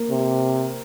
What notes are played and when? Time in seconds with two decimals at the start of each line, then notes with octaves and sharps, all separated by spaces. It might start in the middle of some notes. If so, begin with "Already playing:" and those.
Already playing: A#3
0.11 C3